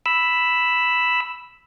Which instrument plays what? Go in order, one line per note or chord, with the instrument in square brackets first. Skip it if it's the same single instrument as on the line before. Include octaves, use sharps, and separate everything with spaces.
[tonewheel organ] B5 E6